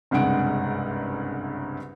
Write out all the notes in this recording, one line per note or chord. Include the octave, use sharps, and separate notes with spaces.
F#1 C2 G2 G#3 F#5 D7